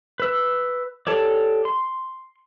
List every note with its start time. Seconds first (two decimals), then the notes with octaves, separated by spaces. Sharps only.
0.20 B4 E6
1.07 G4 A4 C#5 D5
1.65 C6